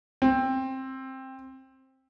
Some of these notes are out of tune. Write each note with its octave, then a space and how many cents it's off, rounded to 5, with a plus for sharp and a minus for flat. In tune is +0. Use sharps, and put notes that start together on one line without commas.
C4 +15